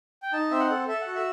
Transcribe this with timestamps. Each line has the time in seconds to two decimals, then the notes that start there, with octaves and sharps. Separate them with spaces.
0.22 G5
0.33 D#4 A5
0.51 C4 E5
0.60 F#5
0.70 A4
0.88 A4 E5
1.01 F#5
1.06 F#4
1.15 E5